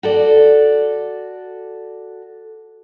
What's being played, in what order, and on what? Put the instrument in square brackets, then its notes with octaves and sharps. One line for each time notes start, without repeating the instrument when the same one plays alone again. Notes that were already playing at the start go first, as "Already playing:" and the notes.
[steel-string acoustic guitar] F#4 A4 D5